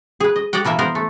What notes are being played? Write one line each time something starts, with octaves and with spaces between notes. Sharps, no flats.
G#4 B4
D#5
G4 D5 D#5 F#5 G5
B2 E3 A#3 E5
B3 A#4 C5
A3